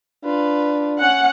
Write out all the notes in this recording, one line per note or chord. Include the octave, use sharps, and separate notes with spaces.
D4 F4 B4
C#4 F#5